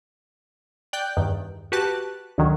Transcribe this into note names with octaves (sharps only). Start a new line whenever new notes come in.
D5 G5 F#6 G6
E2 G2 D#3
F#4 G4 B4 A5 F#6
D2 D#3 F#3